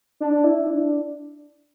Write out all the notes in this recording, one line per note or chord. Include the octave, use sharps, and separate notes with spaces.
D4
E4
D4